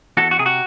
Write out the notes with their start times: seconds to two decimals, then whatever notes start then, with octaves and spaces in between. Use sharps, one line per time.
0.17 E2 F#4 A4
0.31 F#4
0.39 C3 G#4
0.46 F#4